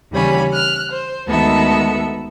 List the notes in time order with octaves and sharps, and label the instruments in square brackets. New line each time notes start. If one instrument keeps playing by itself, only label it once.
[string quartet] D#2 C#3 E3 G3 C#4 B5
F6 F#6
C5
D2 D#3 G#3 B3 A4 E5